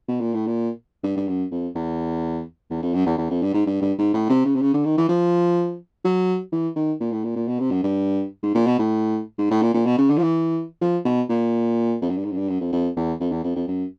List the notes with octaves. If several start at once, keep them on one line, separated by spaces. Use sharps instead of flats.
B2
A#2
A2
A#2
G2
G2
F#2
F2
E2
E2
F2
F#2
E2
E2
F2
G2
G#2
G2
G2
G#2
A2
C3
C#3
C3
C#3
D3
D#3
E3
F3
F#3
E3
D#3
A#2
A2
A#2
A#2
B2
C3
F#2
G2
G#2
A#2
B2
A2
G#2
A2
A#2
A#2
B2
C#3
D3
F3
E3
F3
B2
A#2
F2
F#2
G2
G#2
F#2
G2
F#2
F2
F2
E2
F2
E2
F2
F2
F#2